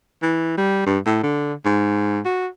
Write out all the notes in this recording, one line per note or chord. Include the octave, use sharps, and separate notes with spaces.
E3
G3
G2
A2
D3
G#2
F#4